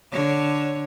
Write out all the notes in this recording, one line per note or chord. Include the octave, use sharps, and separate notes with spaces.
D3 C#5